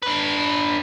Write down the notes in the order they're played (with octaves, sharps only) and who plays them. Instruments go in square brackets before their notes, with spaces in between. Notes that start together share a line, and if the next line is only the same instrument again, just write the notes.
[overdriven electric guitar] D3 B4